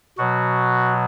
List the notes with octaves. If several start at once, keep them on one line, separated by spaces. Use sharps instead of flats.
B2 F#3 F#4